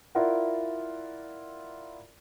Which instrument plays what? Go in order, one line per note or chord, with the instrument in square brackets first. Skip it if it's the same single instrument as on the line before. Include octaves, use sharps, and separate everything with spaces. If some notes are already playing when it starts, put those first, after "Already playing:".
[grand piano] E4 F4 A#4 D5 E5 F#5